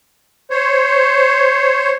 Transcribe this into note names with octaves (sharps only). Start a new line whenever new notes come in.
C5 C#5